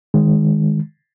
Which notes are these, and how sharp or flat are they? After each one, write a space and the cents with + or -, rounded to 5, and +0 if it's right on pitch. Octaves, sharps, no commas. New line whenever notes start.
D#3 +0 G#3 +0